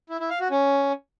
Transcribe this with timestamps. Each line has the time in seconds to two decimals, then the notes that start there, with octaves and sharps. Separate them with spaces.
0.10 E4
0.20 E4
0.30 F5
0.40 F#4
0.51 C#4